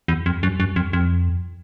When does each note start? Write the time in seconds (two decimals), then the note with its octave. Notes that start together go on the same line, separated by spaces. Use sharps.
0.08 E2
0.26 F2
0.43 F#2
0.60 F#2
0.76 F2
0.93 F2